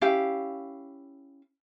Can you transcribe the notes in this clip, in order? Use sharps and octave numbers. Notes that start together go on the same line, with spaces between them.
C#4 E4 G4 F5